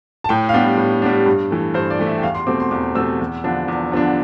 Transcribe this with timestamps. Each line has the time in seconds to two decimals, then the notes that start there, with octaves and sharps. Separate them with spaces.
0.24 A5
0.29 A2 G5
0.49 F5
0.54 G3 B3 D4 G5
0.77 A2
1.02 G3 B3 D4
1.26 G2
1.51 E3 A3
1.74 G2 C5
1.90 D5
1.99 E3 A3
2.07 E5
2.18 G5
2.22 E2 F5
2.35 C6
2.47 B2 A3 C4 D6
2.60 C6
2.71 E2 D6
2.95 B2 A3 C4 E6
3.20 E2
3.44 D3 F3 B3 D4
3.68 E2
3.92 D3 F3 B3 D4